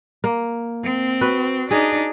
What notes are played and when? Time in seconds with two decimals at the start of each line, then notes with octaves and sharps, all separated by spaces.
0.24 A#3
0.83 C4
1.21 F#4 B4
1.71 D4 D#4 G#4